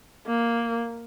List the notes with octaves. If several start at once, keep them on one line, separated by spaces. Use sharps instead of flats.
A#3